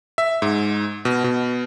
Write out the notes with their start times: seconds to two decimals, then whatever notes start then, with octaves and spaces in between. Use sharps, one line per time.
0.18 E5
0.42 G#2
1.05 B2
1.24 B2